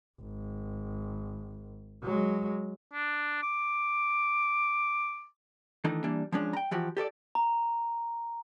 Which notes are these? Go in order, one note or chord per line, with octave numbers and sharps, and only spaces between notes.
G#1
F#3 G#3
D4
D6
D#3 E3 A3 D4 D#4
E3 G3 A#3 D4
F3 G#3 C#4 D4
G5 A#5
E3 F3 F#4 G4
G4 A4 C#5 D5
A#5